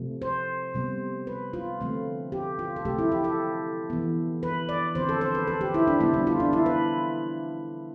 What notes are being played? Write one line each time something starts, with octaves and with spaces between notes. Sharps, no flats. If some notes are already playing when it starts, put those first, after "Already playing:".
Already playing: C3 F3 A3
C5
C3 G3 B3
B4
F4
D3 F3 A3 C4
G4
F4
A4
C3 F3 A3 C4 G4
E4
G4
A4
E3 B3
B4
D5
D3 F3 C4 C5
A4
C5
B4
A4
G4
E4
D4
D3 G3 B3 E4
D4
F4
D4
E4
B4